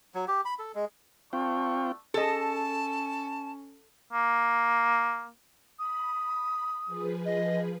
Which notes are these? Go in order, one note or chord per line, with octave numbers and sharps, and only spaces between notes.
F#3
G4
B5
A4
G#3
A3 C4 D4 F4 G5 C#6
C#4 G#4 A4 D#5 A5
A#3
B5 D#6
F3 G#4 B4
D#5